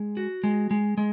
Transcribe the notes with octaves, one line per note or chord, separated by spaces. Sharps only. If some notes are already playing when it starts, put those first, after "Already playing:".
Already playing: G#3
F#4
G#3
G#3
G#3